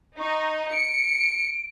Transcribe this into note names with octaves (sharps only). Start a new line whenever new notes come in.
D#4 C#6
C#7 D7